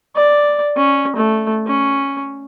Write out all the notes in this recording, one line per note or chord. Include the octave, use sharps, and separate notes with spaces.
D5
C#4
A3
C#4